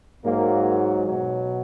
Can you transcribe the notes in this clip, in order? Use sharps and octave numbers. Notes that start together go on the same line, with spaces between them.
G#2 F#3 A#3
B2 F#3